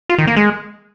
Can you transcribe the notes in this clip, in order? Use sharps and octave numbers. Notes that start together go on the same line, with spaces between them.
F4
D#3
A#3
G#3